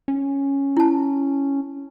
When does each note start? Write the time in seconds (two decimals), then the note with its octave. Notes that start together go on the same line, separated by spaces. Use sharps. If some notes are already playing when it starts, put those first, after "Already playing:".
0.08 C#4
0.77 E4 A5